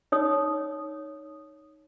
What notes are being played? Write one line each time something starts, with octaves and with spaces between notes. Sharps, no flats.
D#4 C#5 D#6